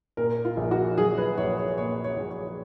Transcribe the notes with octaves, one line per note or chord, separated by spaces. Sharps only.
A#2 A#4
F4
A#1
F#4
F#3 G#4
B4
A#1 C#5
C#5
A#2 C#5
C#5
A#1
C#5